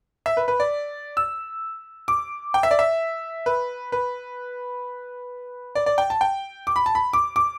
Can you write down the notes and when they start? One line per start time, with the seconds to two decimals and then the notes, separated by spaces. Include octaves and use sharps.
0.26 E5
0.37 B4
0.48 B4
0.60 D5
1.17 E6
2.08 D6
2.54 G5
2.63 E5
2.71 D5
2.79 E5
3.46 B4
3.92 B4
5.75 D5
5.86 D5
5.98 G5
6.10 A5
6.21 G5
6.67 D6
6.76 B5
6.86 A5
6.95 B5
7.13 D6
7.36 D6